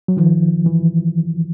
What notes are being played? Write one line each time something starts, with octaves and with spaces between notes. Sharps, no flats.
F#3
D#3 F3
E3